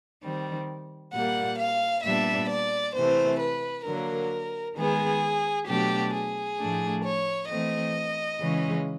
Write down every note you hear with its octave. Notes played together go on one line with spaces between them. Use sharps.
D#3 G3 C4
A#2 G3 A#3 F#5
F5
A#2 G3 B3 D4 E5
D5
C3 E3 A3 C5
B4
D3 F#3 A#3 A#4
D#3 G#3 B3 G#4
B2 F#3 A3 D4 G4
G#4
A2 F3 A3 D4
C#5
E3 A3 C4 D#5
C#3 E3 G#3 C#4